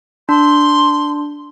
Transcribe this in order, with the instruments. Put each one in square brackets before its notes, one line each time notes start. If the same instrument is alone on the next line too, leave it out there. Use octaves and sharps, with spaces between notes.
[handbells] D4 [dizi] C6